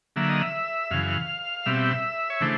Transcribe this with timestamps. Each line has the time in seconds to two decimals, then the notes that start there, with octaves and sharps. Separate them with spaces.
0.16 D3 F#3 A#3 E5
0.29 D#5
0.42 E5
0.91 F#2 C#3 E3 F5
1.66 B2 G3 C4 E5
2.30 C#5
2.41 C#3 E3 A3 D4 C5